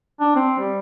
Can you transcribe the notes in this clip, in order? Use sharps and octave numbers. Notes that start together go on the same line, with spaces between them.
D4
C4
G3